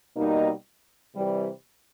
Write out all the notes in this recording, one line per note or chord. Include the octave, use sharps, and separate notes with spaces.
B2 G3 A#3 D#4
C3 E3 G3